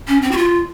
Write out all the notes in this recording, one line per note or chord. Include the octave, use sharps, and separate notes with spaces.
C#4
C4
F#4
F4